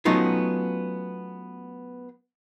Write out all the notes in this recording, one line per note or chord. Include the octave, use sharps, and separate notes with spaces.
F#3 A3 B3 C#4 D#4 F4